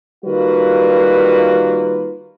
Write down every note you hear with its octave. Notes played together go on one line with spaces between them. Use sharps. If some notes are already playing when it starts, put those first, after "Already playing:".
D#3 G3 A#3 F4 F#4 B4